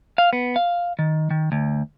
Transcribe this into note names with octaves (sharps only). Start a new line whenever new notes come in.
F5
B3
F5
D#3
D#3
D2